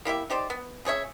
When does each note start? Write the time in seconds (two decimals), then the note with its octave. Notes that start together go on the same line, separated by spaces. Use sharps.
0.05 A#3 E4 G4 E5
0.30 D#4 G4 C5 D5
0.50 B3
0.85 C#3 G#4 C#5 E5